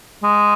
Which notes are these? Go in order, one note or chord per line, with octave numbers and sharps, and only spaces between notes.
G#3